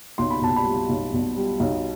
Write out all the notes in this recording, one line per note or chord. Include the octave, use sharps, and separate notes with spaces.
B1 C6
B5
B2 A5
B5
G3
B1
B2
G3
B1